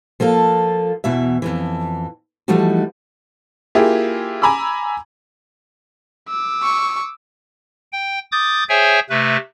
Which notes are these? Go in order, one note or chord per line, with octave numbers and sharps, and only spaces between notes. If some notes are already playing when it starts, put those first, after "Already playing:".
F3 A#3 F4 A4
E2 B2 E3 E5
F2 G#2 E3
E3 F3 G3 A3 D#4 F#4
A#3 E4 F4 G4 G#4
G#5 A#5 B5 D6 E6
D6 E6
C#6
G5
D6 D#6 G6 A6
G#4 C5 C#5 E5 G5 G#5
C3 A3 B4